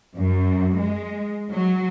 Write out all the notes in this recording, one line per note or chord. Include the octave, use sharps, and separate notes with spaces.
F#2
G#3
F#3